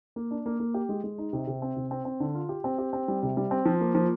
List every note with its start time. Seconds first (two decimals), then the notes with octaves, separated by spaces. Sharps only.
0.16 A#3
0.31 D4
0.46 A#3
0.60 A#3
0.74 G4
0.89 G#3
1.04 G#3
1.18 D#4
1.33 C3
1.47 C3
1.62 C4
1.76 C3
1.91 C4
2.05 C4
2.20 D3
2.35 F4
2.49 G4
2.64 C4
2.78 G4
2.93 C4
3.08 G3
3.23 C3
3.37 G3
3.51 C4
3.65 F3
3.81 A#3
3.95 F3